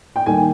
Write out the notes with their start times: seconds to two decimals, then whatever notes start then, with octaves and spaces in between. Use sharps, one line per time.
0.16 G5
0.26 D#2 D#3 G3 G#5